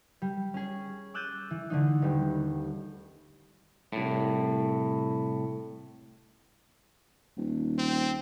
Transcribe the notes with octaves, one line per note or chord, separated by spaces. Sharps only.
G3
C#4 G#4
D6 E6 F#6 G6 A6 D#7
E3
D3 A3 D#4
D#1 G3
C2 A2
D#1
C4